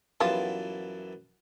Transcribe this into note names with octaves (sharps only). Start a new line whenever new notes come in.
F#2 E3 G3 B3 F4 A5